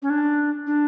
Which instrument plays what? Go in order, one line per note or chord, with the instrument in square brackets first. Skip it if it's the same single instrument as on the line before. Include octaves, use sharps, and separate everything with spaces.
[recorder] C#4
D4
D4